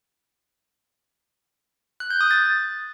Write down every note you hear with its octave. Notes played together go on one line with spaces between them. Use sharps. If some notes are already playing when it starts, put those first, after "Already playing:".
F#6
G6
D#6
A6